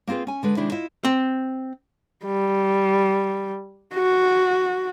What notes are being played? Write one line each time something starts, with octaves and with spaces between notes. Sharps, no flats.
A#3 C4 F4 G#4 B4
C#4 G#5
D3 G#3 B4
C3 D#3 G#3 D4 E4
E4 F4 D#5
C4
G3
F#4